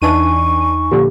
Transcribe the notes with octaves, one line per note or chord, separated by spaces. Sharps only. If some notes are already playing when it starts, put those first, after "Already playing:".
E2 E3 D4 D#4 G#5 C#6 D#7
A#1 A#2 D3 G4